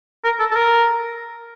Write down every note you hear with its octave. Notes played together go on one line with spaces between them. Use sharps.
A#4
A4
A4
A#4